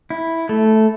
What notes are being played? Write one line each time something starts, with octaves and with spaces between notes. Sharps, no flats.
E4
A3